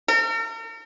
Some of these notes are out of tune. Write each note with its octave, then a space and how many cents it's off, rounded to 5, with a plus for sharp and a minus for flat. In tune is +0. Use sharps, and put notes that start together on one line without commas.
A#4 -45